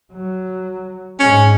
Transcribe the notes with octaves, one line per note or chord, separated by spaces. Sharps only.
F#3
G#2 G#3 C#4